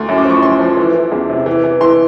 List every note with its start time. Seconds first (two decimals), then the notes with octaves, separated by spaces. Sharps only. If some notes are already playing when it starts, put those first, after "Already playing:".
Already playing: D2
0.09 F#2
0.18 D6
0.25 F3
0.30 C#6
0.42 F#2 C6
0.59 F3
0.77 E3
0.94 E3
1.12 E2
1.30 C3
1.46 E3
1.64 E3
1.81 E3 C6